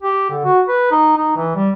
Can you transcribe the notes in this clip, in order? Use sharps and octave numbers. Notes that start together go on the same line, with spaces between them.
G4
D3
F#4
B4
D#4
D#4
E3
G3